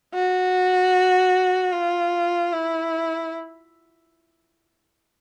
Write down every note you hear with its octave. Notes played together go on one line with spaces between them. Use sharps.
F#4
F4
E4